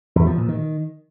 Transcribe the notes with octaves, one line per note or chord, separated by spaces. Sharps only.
E2
F3
A#2
D#3